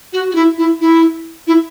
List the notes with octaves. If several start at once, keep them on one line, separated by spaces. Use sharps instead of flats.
F#4
F#4
E4
E4
E4
E4